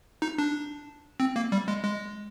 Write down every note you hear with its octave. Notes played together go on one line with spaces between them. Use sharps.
D#4
D4
C4
A#3
G3
G#3
G#3